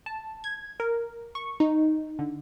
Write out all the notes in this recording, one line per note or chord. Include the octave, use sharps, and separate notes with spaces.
A5
G#6
A#4
C#6
D#4
D3